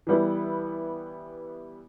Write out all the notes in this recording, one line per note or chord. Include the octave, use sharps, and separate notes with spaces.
E3 G3 B3 E4